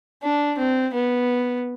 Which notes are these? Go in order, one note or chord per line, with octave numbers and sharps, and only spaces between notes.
D4
C4
B3